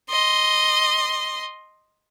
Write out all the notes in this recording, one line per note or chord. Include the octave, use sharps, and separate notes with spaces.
D#5 C6